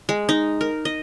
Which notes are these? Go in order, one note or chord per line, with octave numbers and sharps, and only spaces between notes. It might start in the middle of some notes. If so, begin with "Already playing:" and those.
G#3
D#4
A#4
D#5